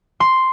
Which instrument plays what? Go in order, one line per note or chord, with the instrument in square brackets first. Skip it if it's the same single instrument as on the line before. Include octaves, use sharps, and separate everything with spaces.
[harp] C6